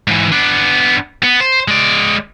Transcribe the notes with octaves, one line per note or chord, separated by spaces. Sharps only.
G#2 E3
B3 D4
B3
C5
G#3 D5